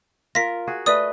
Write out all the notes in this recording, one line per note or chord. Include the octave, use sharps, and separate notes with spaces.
F4 A#4 A#6 B6
F#4 G#4
A3 B4 D5 D#5 D#6